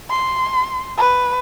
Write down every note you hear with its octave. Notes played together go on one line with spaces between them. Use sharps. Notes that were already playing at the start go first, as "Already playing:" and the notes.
C6
B4